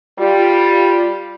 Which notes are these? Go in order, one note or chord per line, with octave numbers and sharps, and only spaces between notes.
G3 F4